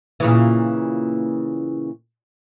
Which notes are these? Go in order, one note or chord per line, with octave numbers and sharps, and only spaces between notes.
A#2 C#3 E3